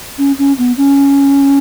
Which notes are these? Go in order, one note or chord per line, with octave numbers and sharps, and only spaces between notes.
C#4
C#4
B3
C#4